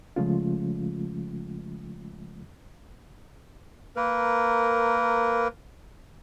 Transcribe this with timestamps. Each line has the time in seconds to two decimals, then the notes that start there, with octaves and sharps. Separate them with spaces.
0.16 C#3 F3 G#3 A3 C#4 F4
3.96 A#3 A#4 B4